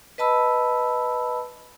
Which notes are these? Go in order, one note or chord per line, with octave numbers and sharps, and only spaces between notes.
B4 D#5 A5 B5 E6